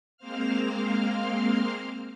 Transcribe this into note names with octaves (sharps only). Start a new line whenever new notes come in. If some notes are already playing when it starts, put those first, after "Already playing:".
G#3 A#3 C4 C5 F5 F6